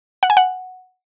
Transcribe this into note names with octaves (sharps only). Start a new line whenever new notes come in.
F#5
G#5
F#5